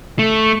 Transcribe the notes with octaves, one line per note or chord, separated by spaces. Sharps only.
A3